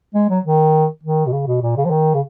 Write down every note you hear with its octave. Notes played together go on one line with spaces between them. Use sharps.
G#3
F#3
D#3
D#3
B2
C#3
B2
A#2
C#3
F3
D#3
C#3